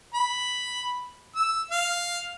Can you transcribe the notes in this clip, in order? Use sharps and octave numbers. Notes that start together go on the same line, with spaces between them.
B5
E6
F5